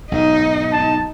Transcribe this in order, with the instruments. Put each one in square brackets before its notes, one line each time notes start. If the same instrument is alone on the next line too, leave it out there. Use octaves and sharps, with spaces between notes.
[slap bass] B1 G#2 [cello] D#4
[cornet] A5